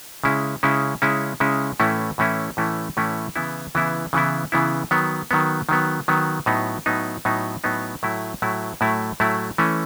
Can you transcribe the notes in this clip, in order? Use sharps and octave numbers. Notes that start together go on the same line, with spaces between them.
C#3 G#3 C#4 E4
C#3 G#3 C#4 E4
C#3 G#3 C#4 E4
C#3 G#3 C#4 E4
A2 E3 A3 C#4 E4
A2 E3 A3 C#4 E4
A2 E3 A3 C#4 E4
A2 E3 A3 C#4 E4
C#3 E3 B3 E4
C#3 E3 B3 E4
C#3 E3 B3 E4
C#3 E3 B3 E4
D#3 F#3 B3
D#3 F#3 B3
D#3 F#3 B3
D#3 F#3 B3
A2 F#3 B3 D#4
A2 F#3 B3 D#4
A2 F#3 B3 D#4
A2 F#3 B3 D#4
A2 F#3 A3 E4
A2 F#3 A3 E4
A2 F#3 A3 E4
A2 F#3 A3 E4
E3 A3 C#4